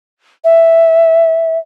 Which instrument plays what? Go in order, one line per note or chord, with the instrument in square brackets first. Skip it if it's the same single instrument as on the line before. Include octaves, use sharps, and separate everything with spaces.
[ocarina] E5